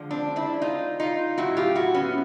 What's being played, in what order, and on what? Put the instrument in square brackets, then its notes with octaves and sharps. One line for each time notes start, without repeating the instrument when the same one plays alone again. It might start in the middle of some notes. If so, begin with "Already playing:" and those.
Already playing: [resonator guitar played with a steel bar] D3 F3 G#3
C4 D4
D4 E4
D#4 F4
D#4 F4
A2 F#3 A3 E4 F#4
F4 G4
E4 F#4
B3 C#4